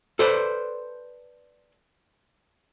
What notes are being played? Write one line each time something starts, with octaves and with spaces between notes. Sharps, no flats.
A4 B4 C5 D5